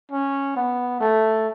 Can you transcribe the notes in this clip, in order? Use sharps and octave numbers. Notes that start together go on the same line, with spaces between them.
C#4
B3
A3